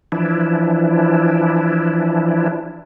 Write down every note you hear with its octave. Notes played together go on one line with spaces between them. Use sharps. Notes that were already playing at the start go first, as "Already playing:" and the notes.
E3 F3 D4 E4